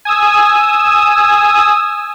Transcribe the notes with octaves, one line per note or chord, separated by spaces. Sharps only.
G#5 D#6 E6